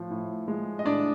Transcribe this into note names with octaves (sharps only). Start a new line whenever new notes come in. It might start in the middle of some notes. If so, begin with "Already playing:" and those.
Already playing: A2 F3
A2
G#3
D#5
A2 D4 D5